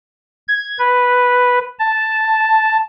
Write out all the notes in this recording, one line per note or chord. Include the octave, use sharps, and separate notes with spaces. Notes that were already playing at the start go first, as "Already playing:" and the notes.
G#6
B4
A5